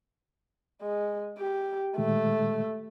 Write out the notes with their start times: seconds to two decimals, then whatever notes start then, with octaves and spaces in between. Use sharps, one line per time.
0.82 G#3
1.38 G4
1.98 A#2 D#3 G#3 A3